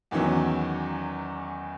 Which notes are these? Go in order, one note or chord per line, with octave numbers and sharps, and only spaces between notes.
E2 D#3 E3 F#3 C#4